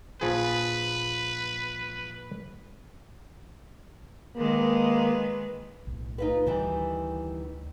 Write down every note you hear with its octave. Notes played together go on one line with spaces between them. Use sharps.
A#1 F3 G#4 B4
D#3 G#3 A#3 B4
B1 A2
D#4 F4 B4
D2 D#3 E3 G3